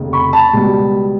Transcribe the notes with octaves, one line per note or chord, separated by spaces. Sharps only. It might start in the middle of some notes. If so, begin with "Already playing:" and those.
Already playing: F1 D#2 C#3
B5 C#6
A5 B5
C#2 B2 G3